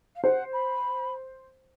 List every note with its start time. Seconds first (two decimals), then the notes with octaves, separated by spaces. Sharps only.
0.15 F5
0.23 C5 F#5
0.52 B5